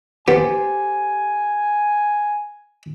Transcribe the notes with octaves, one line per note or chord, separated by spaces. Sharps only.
B3 G4 A4 C5 G#5